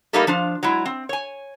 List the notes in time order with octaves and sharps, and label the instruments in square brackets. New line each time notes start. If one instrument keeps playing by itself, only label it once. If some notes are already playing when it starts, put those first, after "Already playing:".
[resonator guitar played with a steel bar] G3 A3 A#3 D#4 G4 A4
F3 D4 F4
F#3 G#3 E4
C4
C#5 G#5